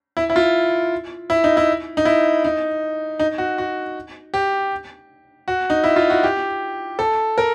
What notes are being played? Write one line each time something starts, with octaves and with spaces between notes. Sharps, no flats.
E4
E4
F4
E4
D#4
E4
D#4
E4
D#4
D#4
F#4
F#4
G4
F#4
D#4
E4
F4
F#4
G4
A4
A#4